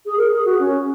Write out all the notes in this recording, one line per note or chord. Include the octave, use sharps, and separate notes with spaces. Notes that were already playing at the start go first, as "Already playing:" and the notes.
G#4
A#4
G#4
F#4
C#4